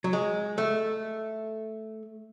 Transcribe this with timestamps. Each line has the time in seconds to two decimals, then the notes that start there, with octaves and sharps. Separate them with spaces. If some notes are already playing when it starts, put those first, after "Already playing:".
0.04 F#3
0.13 G#3
0.58 A3